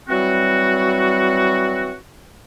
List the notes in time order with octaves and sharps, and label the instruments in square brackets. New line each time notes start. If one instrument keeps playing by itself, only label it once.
[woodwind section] E3 F#3 G3 C4 F#4